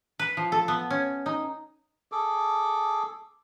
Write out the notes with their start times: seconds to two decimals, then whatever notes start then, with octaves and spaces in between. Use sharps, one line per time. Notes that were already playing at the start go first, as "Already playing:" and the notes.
0.19 B4
0.37 F3
0.52 A4
0.68 B3
0.90 C#4
1.26 D#4
2.12 G#4 A4 D6